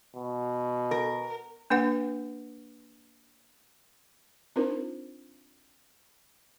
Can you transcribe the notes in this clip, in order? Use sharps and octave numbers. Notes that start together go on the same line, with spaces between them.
B2
A#4
A#3 D4 B4 F#5
C4 D4 D#4 F4 A#4 C5